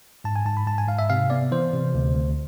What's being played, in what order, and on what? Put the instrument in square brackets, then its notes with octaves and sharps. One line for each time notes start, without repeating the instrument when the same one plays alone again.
[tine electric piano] G#2 A5
G#5
G#2 A5
B5
G#2 A5
G#5
G#2 F5
E5
C3 F5
B3 D5
E3 C5
C3
D2
D2